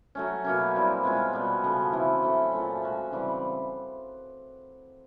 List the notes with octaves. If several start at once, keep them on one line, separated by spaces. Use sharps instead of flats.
F#3 A3 C#4
B2 F#3 A#3 C#4
G3 C4 E4
B2 G#3 C#4 F4
B2 G3 B3
C#3 F3 A3
E3 A3 C4 E4
F#3 A3 C#4
A#2 F3 A3 C#4
G#3 C#4 F#4
C#3 E3 G3 C4